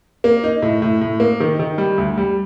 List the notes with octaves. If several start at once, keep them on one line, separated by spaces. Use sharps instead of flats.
A#3
D#4
A2
A2
A2
A#3
D#3
D#3
G3
D2
G3